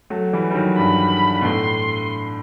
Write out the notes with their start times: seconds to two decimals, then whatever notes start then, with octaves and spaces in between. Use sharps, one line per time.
0.10 F#3 A3
0.33 E3 G3
0.50 G3
0.55 D#3 F#3
0.78 G2 B5
1.41 B2
1.45 A2 C6